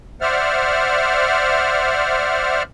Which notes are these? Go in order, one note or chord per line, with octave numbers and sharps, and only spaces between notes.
C5 D5 E5 F#5 F6